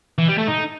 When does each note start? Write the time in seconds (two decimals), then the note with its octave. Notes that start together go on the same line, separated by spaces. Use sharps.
0.18 E3
0.28 G3
0.38 A3
0.47 D#4